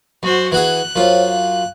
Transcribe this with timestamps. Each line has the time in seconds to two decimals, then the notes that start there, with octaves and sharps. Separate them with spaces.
0.23 F#2 F#4 C5
0.52 E3 F#4 G#4 F#6
0.96 F#2 F4 C5 C#5 F5
1.29 F5